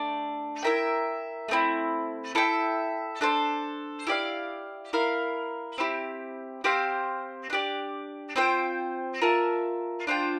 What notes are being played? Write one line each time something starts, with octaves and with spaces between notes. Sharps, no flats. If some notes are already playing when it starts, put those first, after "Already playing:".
Already playing: A3 D4 D5
E4 A#4 E5 G5
A3 C4 E4
E4 A4 E5 G5
D4 A4 C5
E4 G4 D5 F5
E4 A#4 F5
C4 E4 G4
C4 G4 C5 F5
D4 G4 D5
C4 F4 C5 G5
F4 A#4 E5 A5
D4 F4 C5 G5